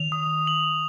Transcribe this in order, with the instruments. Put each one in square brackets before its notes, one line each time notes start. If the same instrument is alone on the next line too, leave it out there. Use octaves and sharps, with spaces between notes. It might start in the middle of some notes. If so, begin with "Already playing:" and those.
Already playing: [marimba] D#3 [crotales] F7
[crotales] D#6
F#7